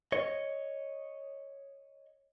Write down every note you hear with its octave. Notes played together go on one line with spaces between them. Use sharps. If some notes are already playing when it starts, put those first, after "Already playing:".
C#5 D#5